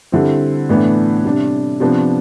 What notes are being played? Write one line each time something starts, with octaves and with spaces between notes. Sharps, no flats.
D3 G3 C4 E4
A2 E3 B3 D4
C3 G3 D4
C3 F3 B3 D4